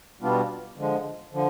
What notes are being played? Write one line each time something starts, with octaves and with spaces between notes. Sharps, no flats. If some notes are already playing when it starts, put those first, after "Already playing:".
B2 G3 B3 D4 F4
D3 F3 G#3
D3 F3